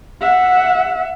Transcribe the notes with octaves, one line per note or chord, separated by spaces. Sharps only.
E5 F#5